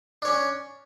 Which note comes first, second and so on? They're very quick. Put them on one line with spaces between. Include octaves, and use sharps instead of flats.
D4 C#5 C#4